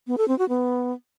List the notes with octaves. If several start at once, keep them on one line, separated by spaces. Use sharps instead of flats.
B3
A4
C4
F#4
B3